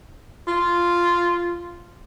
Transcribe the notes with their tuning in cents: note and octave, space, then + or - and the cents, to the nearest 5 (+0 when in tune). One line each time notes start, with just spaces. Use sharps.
F4 -5